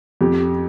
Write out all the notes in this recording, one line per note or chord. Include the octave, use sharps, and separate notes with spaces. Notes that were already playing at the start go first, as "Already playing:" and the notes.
F2 G4